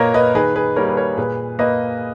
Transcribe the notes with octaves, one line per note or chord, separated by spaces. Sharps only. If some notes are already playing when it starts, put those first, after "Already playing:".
Already playing: A#2 A#3 A#4 B4 C#5 D#5
B4 D#5
D#3 G#4 B4
G#4 B4
G3 A#3 A#4 C#5
B4
A#4 C#5
A#2 G#4 B4
A#3 B4 D#5